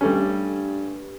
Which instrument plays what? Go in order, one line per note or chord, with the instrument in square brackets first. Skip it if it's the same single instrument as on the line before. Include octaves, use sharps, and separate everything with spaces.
[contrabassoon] G2 [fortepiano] G3 A3 C#4